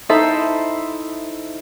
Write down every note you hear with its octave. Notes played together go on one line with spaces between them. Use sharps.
D#4 E4 A4 C5 E5